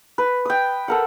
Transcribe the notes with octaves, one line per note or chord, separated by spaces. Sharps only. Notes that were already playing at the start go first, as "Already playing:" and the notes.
B4
G5 D#6
A4 A#4 F#5